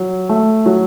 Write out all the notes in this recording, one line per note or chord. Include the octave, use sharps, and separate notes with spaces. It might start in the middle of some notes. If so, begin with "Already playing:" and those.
Already playing: F#3
A3
F#3